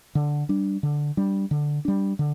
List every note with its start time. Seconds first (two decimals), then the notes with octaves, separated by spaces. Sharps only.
0.15 D3
0.49 G3 D4
0.83 D3
1.17 G3 D4
1.51 D3
1.85 G3 D4
2.19 D3